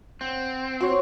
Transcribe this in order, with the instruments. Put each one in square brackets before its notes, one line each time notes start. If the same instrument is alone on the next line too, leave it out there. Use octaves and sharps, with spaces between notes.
[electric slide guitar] C4 [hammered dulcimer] F#5
[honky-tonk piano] F#4 [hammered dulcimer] C5 C#5